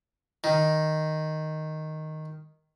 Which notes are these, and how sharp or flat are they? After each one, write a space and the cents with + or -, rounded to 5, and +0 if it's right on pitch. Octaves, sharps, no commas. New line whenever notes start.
D#3 +0